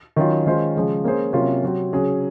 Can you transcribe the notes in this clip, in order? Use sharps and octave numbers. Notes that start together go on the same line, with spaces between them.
D#3 F#3 C#4 F4
D#3 G#3 C#4 F4 C5
C#3 F3 G#3
A#3 C#4 G#4 C5
C3 F#3 A#3 C#4 F4
C3 F#3 C4 F#4
C#3 F#3 C#4 G#4